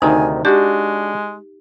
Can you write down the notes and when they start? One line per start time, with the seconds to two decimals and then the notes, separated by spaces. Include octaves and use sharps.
0.02 D2 C3 D#3 D#4 G#5
0.45 G#3 D4 F#4 G4